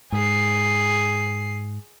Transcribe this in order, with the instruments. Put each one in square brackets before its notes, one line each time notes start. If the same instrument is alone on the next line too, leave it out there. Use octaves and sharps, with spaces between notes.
[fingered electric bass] G#2 [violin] G#4 C7